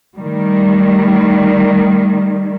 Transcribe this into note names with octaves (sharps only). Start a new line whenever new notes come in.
D#3 G3 A3